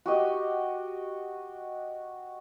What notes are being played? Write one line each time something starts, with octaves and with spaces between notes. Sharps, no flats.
F#4 G4 D#5